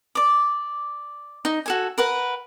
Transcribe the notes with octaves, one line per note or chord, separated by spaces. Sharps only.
D5 D6
D#4
F#4 A4 G#5
A#4 B4 F#5